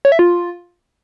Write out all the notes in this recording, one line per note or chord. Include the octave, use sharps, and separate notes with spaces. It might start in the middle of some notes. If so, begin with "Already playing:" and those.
C#5
E5
F4